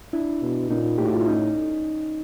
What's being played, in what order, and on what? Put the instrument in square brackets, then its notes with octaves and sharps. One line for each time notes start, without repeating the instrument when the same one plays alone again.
[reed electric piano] D4 E4
[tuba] B2
[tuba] A#2 [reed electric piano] C#4 D#4
[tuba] A2 [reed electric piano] G4
[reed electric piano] F#4
F4
E4
C#4 D#4